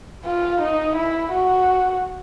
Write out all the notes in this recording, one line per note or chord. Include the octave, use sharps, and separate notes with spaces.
F4
D#4
E4
F#4